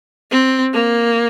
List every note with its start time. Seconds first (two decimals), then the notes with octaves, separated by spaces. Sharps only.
0.31 C4
0.74 A#3